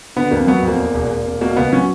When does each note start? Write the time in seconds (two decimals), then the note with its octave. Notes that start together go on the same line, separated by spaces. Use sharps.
0.16 D3 B3
0.31 F2 A#3
0.47 F#3 B3
0.63 F2
0.68 A#3
0.78 E2
0.94 E1
1.10 E1
1.26 E1
1.41 B2 A#3
1.56 C#2 B3
1.72 F#3 C#4